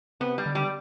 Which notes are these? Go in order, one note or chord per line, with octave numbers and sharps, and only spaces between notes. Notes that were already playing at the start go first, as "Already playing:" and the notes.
C3 B3
G3
D3
G3